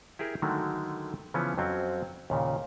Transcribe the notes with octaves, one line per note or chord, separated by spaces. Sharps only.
E4 G4 G#4 A#4
D3 D#3 F#3 G#3 A3
C#3 E3 F3 B3 C#4
F2 F#3 C4 C#4
D#2 A#2 C#3